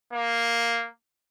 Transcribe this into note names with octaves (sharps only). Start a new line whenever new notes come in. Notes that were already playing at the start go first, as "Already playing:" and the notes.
A#3